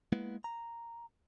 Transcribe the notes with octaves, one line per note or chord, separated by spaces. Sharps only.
G#3 A#3 B3 E4 B4
A#5